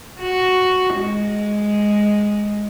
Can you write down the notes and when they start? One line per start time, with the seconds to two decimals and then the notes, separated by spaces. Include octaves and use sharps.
0.22 F#4
0.96 G#3